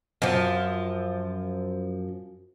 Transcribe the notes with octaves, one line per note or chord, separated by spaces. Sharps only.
F#2 F3